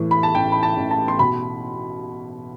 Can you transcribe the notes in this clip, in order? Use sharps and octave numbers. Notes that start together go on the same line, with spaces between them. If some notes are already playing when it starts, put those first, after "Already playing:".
Already playing: A2 E3
B5
A5
A1 G5
B5
A5
A1
A5
C6
B2 B5